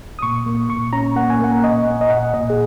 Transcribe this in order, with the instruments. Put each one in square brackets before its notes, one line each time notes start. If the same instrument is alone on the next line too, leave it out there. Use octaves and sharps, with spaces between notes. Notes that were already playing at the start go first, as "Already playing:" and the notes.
[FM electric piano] D#6
A#2 C#6
A#3
A#2 C#6
C#4 A#5
A#3 F#5
G#5
A#3 F#5
A#2 D#5
A#3
D#5
A#2 F#5
A#2 D#5
G#4